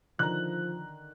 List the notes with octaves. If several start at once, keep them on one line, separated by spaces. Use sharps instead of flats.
D3 D#3 F3 A#5 F#6